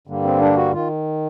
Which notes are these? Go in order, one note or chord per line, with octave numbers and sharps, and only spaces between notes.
G2 D3 G3 A#3
C4
D4
F#4
D#3 F4